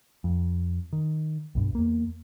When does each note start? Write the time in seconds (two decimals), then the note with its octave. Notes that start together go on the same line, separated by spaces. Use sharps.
0.24 F2
0.93 D#3
1.55 B1 G2
1.75 E2 A#3